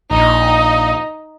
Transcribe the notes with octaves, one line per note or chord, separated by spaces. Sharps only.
A#1 D#4